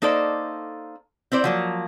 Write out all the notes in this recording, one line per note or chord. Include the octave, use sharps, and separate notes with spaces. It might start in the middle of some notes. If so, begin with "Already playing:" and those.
A#3 D#4 A4 C5 D5
C4 E4 C5 D5
F3 F#3 A#3